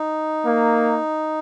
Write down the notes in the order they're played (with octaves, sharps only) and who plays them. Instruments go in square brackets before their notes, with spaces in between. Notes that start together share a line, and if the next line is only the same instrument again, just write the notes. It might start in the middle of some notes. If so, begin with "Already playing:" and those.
Already playing: [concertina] D#4
[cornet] A#3